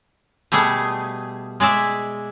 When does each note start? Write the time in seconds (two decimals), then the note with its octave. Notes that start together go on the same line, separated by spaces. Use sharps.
0.52 B2 G3 A3 G#4
1.60 G#3 G#4 D5 E5